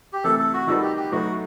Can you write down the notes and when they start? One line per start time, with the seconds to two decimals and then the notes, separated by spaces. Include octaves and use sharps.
0.13 G4
0.24 C3 E3 A3 A4
0.39 A4
0.53 F#4
0.67 D#3 G3 D#4 F#4 A4 B4
0.82 G4
0.96 G4
1.12 A2 F#3 B3 D#4 F#4